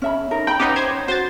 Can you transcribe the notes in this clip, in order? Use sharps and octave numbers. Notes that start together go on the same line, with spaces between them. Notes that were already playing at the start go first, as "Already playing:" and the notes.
C#4 E5 B5
D#4 A#4
G5 B5
B3 C#4 D#4 G4
C5 G#6
F#4 C5 A6